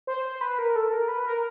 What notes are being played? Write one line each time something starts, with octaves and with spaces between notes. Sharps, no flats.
C5
C5
B4
A#4
A4
A#4
B4
A#4